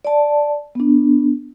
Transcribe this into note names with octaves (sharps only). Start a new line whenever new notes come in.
D5 A5
B3 D4